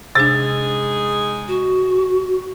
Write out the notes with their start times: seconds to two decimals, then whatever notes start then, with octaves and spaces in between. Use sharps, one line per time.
0.15 C3 G#3 D4 D#4 G#4 A6
1.48 F#4